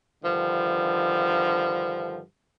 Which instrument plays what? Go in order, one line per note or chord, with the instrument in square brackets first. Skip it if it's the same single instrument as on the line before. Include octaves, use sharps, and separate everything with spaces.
[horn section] G2 D3 D#3 F3